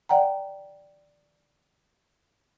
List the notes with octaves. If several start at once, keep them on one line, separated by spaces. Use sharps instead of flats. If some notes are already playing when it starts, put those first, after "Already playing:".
D5 F#5 G5 A#5